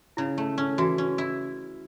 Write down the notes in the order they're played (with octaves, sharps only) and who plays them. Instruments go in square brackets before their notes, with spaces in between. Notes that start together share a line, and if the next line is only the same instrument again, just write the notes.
[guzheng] C#3 [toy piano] E4
[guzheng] A3
C#4
[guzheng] E3 [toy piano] F#4
[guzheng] C#4
E4